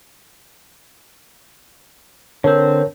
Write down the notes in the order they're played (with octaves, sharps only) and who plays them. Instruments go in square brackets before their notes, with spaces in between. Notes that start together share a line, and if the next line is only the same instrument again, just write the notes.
[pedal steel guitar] D3 C4 [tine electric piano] A#4 C#5